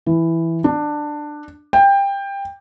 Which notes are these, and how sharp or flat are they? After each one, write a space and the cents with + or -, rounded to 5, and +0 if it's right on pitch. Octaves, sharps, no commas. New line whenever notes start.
E3 +0
D4 +15
G5 +20